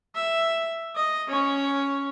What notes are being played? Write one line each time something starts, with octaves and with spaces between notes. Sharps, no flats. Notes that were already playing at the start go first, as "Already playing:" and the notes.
E5
D#5
C#4 C#5